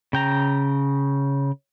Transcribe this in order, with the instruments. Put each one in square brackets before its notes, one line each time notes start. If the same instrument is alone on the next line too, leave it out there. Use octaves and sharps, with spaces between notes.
[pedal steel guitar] C#3 G5 A#5